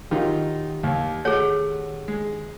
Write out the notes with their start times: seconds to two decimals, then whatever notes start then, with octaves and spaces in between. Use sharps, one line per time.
0.11 D#3 F#3 D#4 F4 G4
0.84 D#2
1.25 A3 G#4 C#5 F#5
2.08 G#3